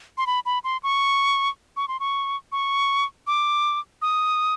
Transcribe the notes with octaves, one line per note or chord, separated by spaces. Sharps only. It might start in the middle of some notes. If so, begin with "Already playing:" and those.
C6
B5
B5
C6
C#6
C#6
C6
C#6
C#6
D6
D#6